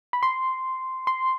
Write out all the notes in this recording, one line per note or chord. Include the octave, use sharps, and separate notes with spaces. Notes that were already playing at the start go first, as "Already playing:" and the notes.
B5
C6
C6